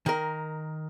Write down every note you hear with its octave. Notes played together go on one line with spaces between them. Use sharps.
D#3 A#4